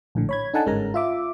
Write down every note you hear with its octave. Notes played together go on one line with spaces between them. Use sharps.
A#1 A2 D3
C#5 B5 G#6
D4 D#4 A4 F#5 G#5 A5
G1 G#2 G#3 C#4 A#4 A#5
F4 E5 D6